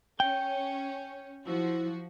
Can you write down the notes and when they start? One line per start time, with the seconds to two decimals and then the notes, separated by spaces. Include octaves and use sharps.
0.20 C#4 G5
1.47 F3 E4 F#4 C5